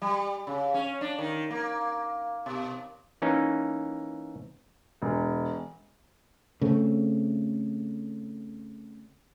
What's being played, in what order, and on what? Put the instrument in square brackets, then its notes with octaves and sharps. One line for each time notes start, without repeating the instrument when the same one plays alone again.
[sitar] G3
C#3
C#4
D4
D#3
A#3
B2
[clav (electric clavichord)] E3 A#3 C#4 D#4
[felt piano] E1
[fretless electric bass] C#3 A3 C4